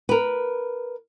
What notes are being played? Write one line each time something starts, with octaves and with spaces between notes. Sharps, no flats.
A#4 B4